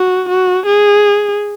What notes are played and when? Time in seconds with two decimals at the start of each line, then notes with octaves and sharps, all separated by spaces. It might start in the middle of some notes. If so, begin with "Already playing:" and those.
Already playing: F#4
0.30 F#4
0.67 G#4